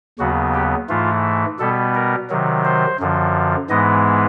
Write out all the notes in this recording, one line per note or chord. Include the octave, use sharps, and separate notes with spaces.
D#2 C#3 F#3 B3 F#4
G4
G#2 E3 A3 F4
B2 G3 B3 A4
A#4
C3 D#3 F#3
C5
F#2 D3 F3
G#2 E3 G#3 B3 D#5